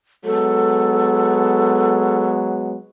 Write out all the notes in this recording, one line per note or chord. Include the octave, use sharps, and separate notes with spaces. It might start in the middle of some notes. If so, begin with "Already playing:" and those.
F#3 G#3 B3 A4